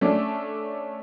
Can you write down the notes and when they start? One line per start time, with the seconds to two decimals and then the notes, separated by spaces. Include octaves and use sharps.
0.01 A3 C#4 D4